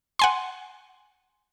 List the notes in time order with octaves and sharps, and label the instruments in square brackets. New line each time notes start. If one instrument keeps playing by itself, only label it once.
[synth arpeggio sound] F#5 G#5 C6